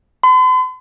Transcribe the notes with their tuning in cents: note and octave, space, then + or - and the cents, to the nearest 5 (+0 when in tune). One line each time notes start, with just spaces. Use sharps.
C6 -45